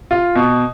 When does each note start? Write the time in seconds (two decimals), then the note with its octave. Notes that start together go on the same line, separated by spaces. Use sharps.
0.11 F4
0.35 B2